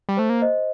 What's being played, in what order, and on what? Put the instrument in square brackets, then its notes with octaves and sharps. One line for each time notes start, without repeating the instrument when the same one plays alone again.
[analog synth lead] G3
[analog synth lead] A3 [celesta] C5
[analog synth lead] A#3
[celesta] C5 D#5